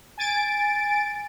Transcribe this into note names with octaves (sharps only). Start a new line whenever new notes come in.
G#5 A6 D7